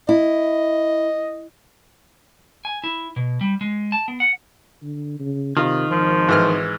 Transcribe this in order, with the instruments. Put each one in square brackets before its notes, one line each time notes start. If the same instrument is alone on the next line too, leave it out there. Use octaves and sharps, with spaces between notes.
[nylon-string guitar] E4 [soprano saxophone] D#5
[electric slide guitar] G#5
E4
B2
G3
G#3
A5
B3
F#5
[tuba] D3
C#3
[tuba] C3 [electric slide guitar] D#3 [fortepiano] F4
[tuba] G#1 [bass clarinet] F3
[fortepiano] G#2 E3 F6